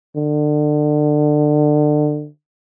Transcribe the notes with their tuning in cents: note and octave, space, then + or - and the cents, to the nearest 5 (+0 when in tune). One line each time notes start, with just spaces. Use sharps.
D3 +30